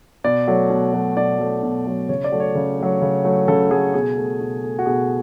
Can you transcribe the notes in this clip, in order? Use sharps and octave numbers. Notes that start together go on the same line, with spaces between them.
B2 D5
F#3 A3
B2
F#3 A3
B2 D5
F#3 A3
B2
F#3 A3
C#3 C#5
D5
F#3 A3
C#5
C#3
F#3 A3
C#3
F#3 A3
C#3 A4
F#3 A3 G#4
B2 G#4
A3
B2
A3
F#4
B2 G#4